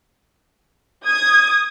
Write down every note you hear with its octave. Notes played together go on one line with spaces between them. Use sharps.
D#6 G#6